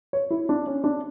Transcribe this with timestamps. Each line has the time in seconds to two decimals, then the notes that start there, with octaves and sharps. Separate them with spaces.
0.13 C#5
0.30 E4
0.49 D4
0.67 C#4
0.84 D4